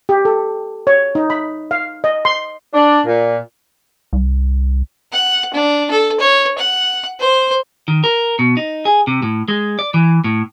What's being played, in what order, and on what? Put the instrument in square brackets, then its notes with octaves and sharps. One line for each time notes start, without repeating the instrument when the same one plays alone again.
[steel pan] G4
A4
C#5
D#4
B5
F5
D#5
C6
[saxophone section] D4
A#2
[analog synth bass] C2
[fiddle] F#5
D4
A4
C#5
F#5
C5
[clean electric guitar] D#3
A#4
B2
D#4
G#4
C3
A2
G#3
D5
E3
A2